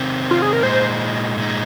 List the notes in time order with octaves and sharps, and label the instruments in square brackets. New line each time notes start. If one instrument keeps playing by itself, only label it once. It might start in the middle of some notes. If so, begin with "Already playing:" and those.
Already playing: [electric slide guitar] C3 D#3 C4
[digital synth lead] F4
G#4
A#4
[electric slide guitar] A#2 G#3 D#4 [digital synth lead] C5
[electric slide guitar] A#2 G#3 D#4